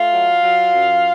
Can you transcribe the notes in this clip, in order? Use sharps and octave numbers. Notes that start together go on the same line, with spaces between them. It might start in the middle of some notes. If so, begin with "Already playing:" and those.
Already playing: A3 F4 F5
F#3
F#3
F#2